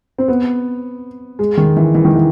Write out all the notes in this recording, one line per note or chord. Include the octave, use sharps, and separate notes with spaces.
C4
B3
G#3
D#3
E3
E3
D#3
E3